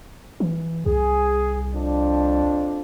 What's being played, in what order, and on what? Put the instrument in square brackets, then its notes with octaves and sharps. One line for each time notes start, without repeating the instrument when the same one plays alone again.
[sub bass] E3
[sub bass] C2 [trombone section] G#4
[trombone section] F2 D4